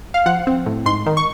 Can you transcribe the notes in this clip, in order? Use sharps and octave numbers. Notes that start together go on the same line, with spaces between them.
F5
F3 F#5
C4
A2
G#2 C6
D#3
C#6